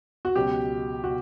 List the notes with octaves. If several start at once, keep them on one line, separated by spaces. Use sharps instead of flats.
F#4
C#2 B2 F#3 G4
B2 F#4